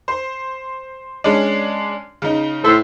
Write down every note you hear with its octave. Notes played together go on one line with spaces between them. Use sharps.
C5
G#3 C#4 D4
C#3 D#4
A2 E4 A4 C5